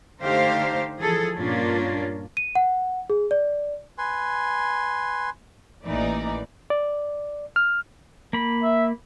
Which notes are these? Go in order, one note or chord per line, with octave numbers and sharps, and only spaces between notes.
D3 A3 D#4 G4 C5 F5
E3 F3 G#4 A4
G2 A#2 A#3 C#4 D4 F4
D#7
F#5
G#4
D5
B4 G#5 C6
A1 E3 A#3 D#4 D5
D5
F6
A#3 B5
E5